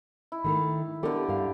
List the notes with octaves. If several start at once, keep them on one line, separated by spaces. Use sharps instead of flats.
E4
D#3 A3 A#4
D3 B3 G4 A4 A#4
G2 F5